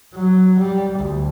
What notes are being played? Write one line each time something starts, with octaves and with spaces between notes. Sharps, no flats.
F#3
G3
D2